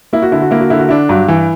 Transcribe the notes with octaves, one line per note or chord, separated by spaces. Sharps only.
A#3 E4
F#4
D3 E4
F#4
A#3 E4
F#4
D3 E4
F#4
D4 E4
G2 F#3 F#4
E3